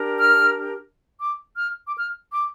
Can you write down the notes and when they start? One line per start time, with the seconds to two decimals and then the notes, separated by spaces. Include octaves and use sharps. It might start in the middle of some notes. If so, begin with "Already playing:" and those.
Already playing: D4 G4 A#4
0.17 F6
1.19 D6
1.56 F6
1.86 D6
1.94 F6
2.31 D6